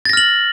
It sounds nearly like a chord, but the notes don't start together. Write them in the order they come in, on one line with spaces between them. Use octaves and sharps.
A6 A#6 F6 F#7